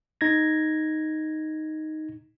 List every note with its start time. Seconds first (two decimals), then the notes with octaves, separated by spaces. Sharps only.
0.21 D#4 G#6 A#6